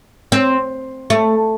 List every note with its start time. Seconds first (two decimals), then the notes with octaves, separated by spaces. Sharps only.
0.32 C4
1.10 A3